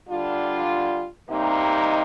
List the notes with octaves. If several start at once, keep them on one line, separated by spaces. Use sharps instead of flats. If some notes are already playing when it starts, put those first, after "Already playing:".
D3 G3 D4 F4
C3 G3 A#3 D#4